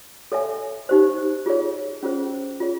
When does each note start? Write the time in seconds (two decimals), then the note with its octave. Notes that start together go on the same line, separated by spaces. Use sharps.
0.32 A4 C#5 E5 G#5
0.89 D#4 G4 C5
1.46 F4 G#4 C#5
2.03 C#4 F4 G#4 C5
2.60 F4 G#4 C#5